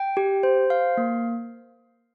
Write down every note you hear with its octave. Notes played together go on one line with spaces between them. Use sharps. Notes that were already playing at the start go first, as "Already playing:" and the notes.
Already playing: G5
G4
C5
F5
A#3